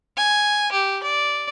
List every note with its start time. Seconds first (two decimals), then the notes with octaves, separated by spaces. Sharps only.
0.17 G#5
0.72 G4
1.03 D5